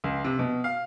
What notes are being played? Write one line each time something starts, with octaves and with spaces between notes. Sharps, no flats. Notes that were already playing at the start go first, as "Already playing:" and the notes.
C#2
C3
B2
F5